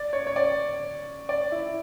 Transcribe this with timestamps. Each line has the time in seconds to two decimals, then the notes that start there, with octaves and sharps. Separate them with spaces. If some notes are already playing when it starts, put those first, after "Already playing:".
Already playing: D5
0.13 C#5
0.27 C#5
0.36 D5
1.29 D5
1.52 E4